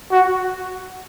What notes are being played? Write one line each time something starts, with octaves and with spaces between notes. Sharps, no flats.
F#4